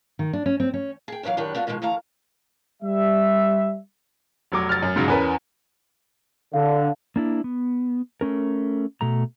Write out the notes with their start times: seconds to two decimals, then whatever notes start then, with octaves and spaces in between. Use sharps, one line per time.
0.19 D#3
0.33 D4
0.46 C#4
0.60 C4
0.74 C#4
1.08 G#4 G5
1.23 D#2 D3 E3 F#3 F5
1.37 F#2 D#3 D4 G4 B4
1.55 A3 B3 D4 F4 F#4
1.67 B2 D#3 F3 F#3 G#3
1.82 D2 E3 A3 F5 A#5
2.83 G3 E5
4.52 F1 F#3 D6
4.69 F6 A6
4.83 F#2
4.96 G#2 C#3 F#3
5.08 E2 C#4 A#4 B4 G#5
6.54 D3 F5
7.16 A#3 D4 E4
7.44 B3
8.21 A3 C#4 A#4
9.01 B2 A3 A#5